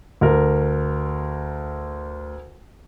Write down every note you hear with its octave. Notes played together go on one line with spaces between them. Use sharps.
D2 A#4